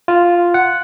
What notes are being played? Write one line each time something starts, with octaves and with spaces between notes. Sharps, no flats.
F4
F#5